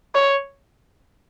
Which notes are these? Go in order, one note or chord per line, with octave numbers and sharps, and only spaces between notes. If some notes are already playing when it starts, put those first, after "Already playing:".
C#5